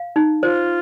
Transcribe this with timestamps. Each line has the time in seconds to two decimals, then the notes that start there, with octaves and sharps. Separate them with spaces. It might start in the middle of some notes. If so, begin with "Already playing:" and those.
Already playing: F5
0.16 D#4
0.43 F4 C5